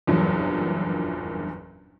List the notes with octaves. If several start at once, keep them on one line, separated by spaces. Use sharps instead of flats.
F#1 E2 G2 A#2 F3 F#3